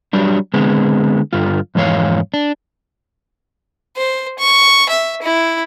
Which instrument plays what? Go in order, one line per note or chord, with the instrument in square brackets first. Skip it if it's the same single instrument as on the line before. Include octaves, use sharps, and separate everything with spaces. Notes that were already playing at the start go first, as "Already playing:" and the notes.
[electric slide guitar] F#3 G3 D4
D3 G#3 B3 C4
G2 D3 F4
F2 G#2 E3 C#4 C#5 F5
D4
[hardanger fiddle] C5
C#6
E5
E4